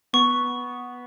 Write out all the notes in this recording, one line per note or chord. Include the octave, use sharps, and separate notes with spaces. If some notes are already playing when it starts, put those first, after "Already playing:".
B3 C#6